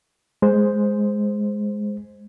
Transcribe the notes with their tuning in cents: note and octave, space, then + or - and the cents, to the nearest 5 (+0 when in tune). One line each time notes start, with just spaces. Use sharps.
G#3 +0 C5 +0